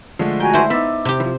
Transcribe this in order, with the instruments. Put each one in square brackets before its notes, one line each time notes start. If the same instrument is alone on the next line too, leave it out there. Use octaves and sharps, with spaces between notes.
[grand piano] D3 G#3 A3 [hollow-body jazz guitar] F3
[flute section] F#4 G#5 A#5 [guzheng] G5
[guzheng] E4 C5
[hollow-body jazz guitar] B3 D#4 [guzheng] E5 [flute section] D6 [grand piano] E6 A6
[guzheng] C3 G4
[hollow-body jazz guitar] E3 F3 [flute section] C5